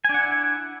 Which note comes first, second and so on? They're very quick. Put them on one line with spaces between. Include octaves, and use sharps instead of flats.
G#5 D4 F#5 E4